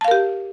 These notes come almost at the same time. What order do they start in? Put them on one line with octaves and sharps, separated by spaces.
A5 F5 A#4 G4